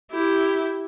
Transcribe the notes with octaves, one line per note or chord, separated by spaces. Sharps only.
E4 G4